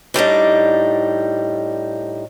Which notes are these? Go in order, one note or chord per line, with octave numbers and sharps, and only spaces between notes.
A2 G3 D4 D#4